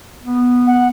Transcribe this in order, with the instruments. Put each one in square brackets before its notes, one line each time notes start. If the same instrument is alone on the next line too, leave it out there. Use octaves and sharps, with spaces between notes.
[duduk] B3
[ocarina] F#5